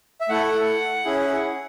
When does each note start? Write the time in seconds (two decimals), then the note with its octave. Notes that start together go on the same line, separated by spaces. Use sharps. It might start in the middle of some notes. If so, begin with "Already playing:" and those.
0.21 E5
0.29 A3 E4 A4 F#5
1.05 C#4 E4 G#4